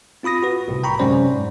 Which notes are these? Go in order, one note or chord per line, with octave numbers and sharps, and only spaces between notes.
C4 F4 B5 D#6 A#6
F#4 B4
C2 A2 C3
G5 A#5 B5 C#6
F#2 C3 G#3 C#4 C5 D5
G#2